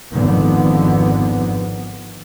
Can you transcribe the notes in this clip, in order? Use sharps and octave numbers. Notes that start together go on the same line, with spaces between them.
G#1 F2 G#2 D3 D#3 B3